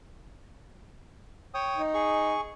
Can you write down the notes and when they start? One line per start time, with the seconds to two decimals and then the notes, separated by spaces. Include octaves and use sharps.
1.54 C#5 G5 D#6
1.77 D#4
1.94 G#4 C#6